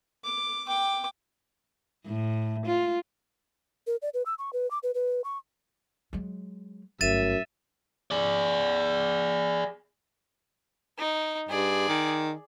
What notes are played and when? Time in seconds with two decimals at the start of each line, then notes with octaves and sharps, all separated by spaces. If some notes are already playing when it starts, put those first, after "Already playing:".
0.24 D6
0.67 G5 D6
2.07 A2
2.66 F4
3.87 A#4
4.02 D5
4.14 B4
4.26 E6
4.39 C#6
4.53 B4
4.71 D6
4.83 B4
4.95 B4
5.24 C#6
6.13 F#3 G#3
7.01 G1 F#2 A3 E5 A6 D#7 E7
8.11 G#4 D5
10.98 D#4
11.49 G2 G#4 D5
11.88 D#3